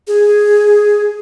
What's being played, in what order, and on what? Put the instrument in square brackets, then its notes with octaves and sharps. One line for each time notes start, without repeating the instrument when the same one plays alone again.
[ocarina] G#4